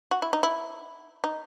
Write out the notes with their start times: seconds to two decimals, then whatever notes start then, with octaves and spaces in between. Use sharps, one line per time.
0.11 F#4
0.22 E4
0.33 D#4
0.43 E4
1.24 D#4